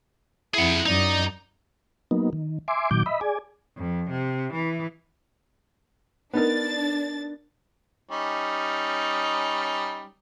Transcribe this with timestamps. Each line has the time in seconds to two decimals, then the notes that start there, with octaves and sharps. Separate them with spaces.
0.54 F2 E4 G#4 F#5
0.86 F#2 D#4 D5
2.11 F#3 A#3 B3 D#4
2.33 D#3
2.68 E5 G#5 C6 D6
2.91 A#2 D#3 F#3 D6 G6
3.06 D#5 E5 B5
3.21 G#4 D5 G#5
3.77 F2
4.10 C3
4.53 E3
6.33 B3 D4 D#4 A#4 A6
8.11 G3 C#4 D#4